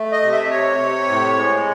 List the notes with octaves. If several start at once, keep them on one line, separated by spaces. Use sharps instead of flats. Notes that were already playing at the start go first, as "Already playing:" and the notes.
Already playing: A3
D#5
C3
E5
C3 C#5
C3
A2
G#3